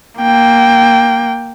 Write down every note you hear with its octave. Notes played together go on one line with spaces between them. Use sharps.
A#3 G5